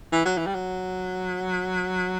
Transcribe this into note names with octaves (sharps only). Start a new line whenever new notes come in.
E3
F#3
E3
G3
F#3